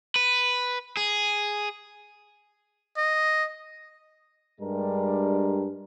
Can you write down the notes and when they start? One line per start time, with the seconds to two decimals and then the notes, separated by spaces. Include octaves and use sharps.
0.16 B4
0.97 G#4
2.97 D#5
4.61 G2 G3 G#3 D4 A#4